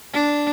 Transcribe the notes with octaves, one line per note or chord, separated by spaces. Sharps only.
D4